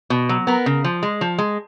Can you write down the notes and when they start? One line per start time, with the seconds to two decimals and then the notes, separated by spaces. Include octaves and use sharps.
0.10 B2
0.29 F#3
0.47 B3 A#4
0.66 C#3
0.84 F3
1.03 G#3
1.21 F3
1.38 G#3